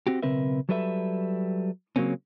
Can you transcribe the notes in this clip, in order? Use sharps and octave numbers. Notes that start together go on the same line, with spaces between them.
C4 F#4 G4
B1 C#3 C4 A#4 B4 E5
F#3 G3 A4 B4 D#5 E5
C#3 F#3 G3 A#3 C4 C#4